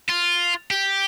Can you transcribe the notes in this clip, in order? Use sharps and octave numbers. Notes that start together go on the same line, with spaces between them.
F4
G4